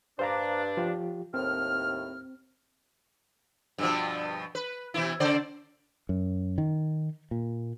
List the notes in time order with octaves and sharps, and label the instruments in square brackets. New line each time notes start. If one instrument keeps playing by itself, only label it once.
[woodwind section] G2 D4 [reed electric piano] C5 F5 A#5
[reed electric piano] F3 F4 G4
[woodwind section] D#2 A2 F6 [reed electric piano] C4
[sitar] G2 B2 F3
B4
B2 E3 E4
C#3 C5 D5
[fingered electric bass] F#2
D#3
A#2